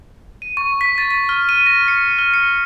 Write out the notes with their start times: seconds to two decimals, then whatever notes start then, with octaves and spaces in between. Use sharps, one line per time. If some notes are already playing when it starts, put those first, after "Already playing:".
0.42 D#7
0.57 C#6
0.81 B6
0.98 A6
1.10 B6
1.29 F6
1.49 D#7
1.66 A#6
1.88 C#7
2.19 F6
2.34 C#7